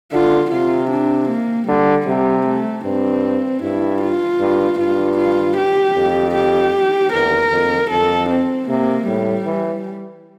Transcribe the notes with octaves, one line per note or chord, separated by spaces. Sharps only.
D3 F4
C3 F4
D4
A#3
D3 G3
C3 G3
A3
G2 C4
G2 E4
F4
G2
G2 F4
F4
G4
F2
G4
E2 A#4
F2
F2 A4
C4
C3 A#3
A2 G3
E3